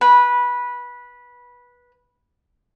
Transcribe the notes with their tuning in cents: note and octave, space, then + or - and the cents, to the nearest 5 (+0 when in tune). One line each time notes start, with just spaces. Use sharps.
B4 -15